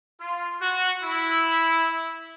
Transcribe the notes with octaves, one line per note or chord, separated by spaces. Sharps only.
F4
F#4
E4